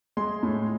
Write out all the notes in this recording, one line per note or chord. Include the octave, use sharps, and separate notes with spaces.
G#3 C6
A2